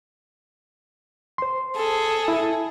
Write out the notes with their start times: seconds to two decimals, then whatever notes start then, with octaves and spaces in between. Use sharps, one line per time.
1.38 C5 C6
1.77 G#4 A4
2.28 E4